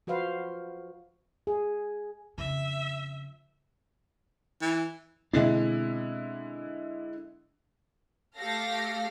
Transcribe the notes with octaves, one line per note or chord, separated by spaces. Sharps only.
F3 F#4 B4 C5 F5
G#4
F2 C#3 E5
E3
B2 D3 G#3 C4 D4 E4
A3 G4 A4 F5 A#6